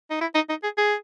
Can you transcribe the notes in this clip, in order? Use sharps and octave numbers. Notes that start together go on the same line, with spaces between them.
D#4
E4
D#4
D#4
G#4
G#4